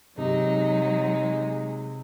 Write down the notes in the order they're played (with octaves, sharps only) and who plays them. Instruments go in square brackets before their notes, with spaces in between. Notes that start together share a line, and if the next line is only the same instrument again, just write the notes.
[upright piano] C3 [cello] F#3 [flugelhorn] G#3 [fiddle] D#4